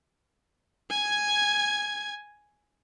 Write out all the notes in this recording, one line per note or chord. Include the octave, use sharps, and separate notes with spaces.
G#5 G#6